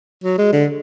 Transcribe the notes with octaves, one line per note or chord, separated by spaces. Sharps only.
F#3
G#3
D3